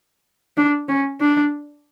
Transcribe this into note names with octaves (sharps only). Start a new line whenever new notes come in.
D4
C#4
D4